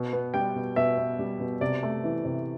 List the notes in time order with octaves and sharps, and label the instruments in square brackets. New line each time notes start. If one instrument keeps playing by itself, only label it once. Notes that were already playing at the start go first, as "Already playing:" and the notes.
Already playing: [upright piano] B2
B3
G3 G5
B2
B2 E5
B3
G3
B2
C3 D5
A3
E3
C3